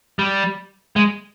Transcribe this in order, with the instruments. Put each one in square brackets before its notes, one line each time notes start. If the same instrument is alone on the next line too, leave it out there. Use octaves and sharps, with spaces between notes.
[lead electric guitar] G3
G#3